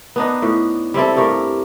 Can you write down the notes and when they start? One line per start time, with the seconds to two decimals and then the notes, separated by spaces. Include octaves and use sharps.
0.16 B3 D4 D#4
0.42 A2
0.94 G3 C4 E4 A4
1.16 G2 A3 G4 A#4